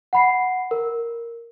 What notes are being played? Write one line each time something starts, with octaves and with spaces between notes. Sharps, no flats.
F#5 B5 C7
A#4